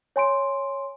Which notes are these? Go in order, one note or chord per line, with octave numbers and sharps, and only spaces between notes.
C#5 G#5 C6 D7